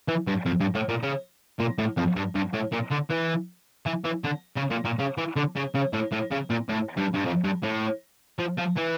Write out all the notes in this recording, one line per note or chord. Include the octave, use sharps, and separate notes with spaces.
E3
G2
F2
G2
A2
A#2
C#3
A#2
A2
F2
G2
G2
A2
A#2
D3
E3
E3
E3
D3
C#3
A#2
A#2
C#3
E3
D3
C#3
C#3
A2
A2
C#3
A#2
A2
G2
G2
F2
G2
A2
F3
F3
E3